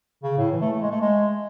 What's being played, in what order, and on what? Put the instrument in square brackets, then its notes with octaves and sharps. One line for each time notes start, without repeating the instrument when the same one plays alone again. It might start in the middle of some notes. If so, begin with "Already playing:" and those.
[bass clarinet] C#3
A2
E3
A3
A3
G#3
A3
G#3